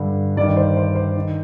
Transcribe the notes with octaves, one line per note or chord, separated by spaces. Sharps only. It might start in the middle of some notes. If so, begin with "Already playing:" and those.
Already playing: G2 D3
G2 D#3 D5
C5
C5
C5
D#3